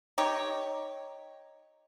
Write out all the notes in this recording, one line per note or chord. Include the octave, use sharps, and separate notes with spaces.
D#4 G4 C#5